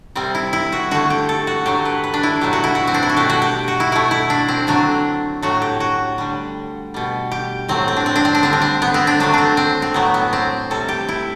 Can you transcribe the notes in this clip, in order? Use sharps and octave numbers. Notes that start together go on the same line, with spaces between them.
C3 G3 C4
E4
E4
F#4
D3 A3 F#4
G4
A4
F#4
D3 F#3 A3 G4
B4
B4
D4
E4
B2 F#3 A3 G4
F#4
E4
F#4
C4
D4
E4
F#4
B2 A3 G4
F#4
G4
F#4
E4
B2 A3 E4
E4
D4
C4
D3 F#3 A3 D4
A2 F#3 A3 F#4
G4
F#4
D3 G3
B2 G3
G4
A2 F#3 A3 C4
C4
D4
C4
D4
C4
D4
D3 G3 C4
D4
C4
B3
C4
D4
D3 F#3 A3 D4
C4 D4
C4
C4
A2 F#3 A3 B3
B3
C4
C3 G3 A4
G4
E4